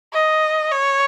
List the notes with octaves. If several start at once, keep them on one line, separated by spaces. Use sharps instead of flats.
D#5
C#5